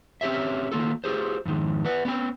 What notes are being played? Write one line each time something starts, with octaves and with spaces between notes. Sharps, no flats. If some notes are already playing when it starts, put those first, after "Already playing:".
C4 C#4 G4 C#5 E5
D#3 A#3 F4 A4
F4 G4 G#4 C5
F2 G#2 D#3
B4 D5 F#5
B3 C#4 D4 G5